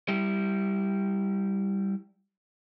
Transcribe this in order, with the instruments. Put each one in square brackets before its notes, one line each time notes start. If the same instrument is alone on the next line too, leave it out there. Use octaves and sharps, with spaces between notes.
[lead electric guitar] G3 E4